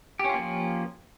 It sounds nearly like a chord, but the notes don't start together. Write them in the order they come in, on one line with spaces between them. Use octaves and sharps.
G4 C#4 F4 A#3 F3